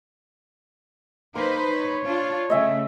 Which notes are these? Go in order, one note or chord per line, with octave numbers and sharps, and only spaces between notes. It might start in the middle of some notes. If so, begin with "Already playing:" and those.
A#3 D#4 B4 C5 C6
C#5
D4 F4
C#3 A3 D#5 E5 G#5